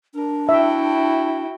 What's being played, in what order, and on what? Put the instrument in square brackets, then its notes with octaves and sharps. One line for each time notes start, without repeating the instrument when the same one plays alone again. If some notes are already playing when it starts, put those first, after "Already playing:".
[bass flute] D4 [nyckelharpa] A#4
[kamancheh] E4 [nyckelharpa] F#4 G5 [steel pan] E5